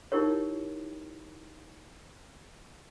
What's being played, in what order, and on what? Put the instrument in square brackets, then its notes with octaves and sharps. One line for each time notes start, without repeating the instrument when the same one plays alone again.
[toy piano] D#4 E4 G4 A#4 C#5